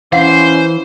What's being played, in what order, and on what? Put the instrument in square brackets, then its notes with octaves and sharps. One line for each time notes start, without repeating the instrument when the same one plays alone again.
[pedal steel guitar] E3 [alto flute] C#4 [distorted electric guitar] C5 [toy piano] F5 F#5